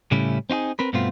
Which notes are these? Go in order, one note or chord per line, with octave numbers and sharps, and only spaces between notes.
A2 C#3 G3 A3 C#4 E4
C4 D#4 F4 G#4
C4 A#4 B4
G2 B2 A3 B3 C4 F4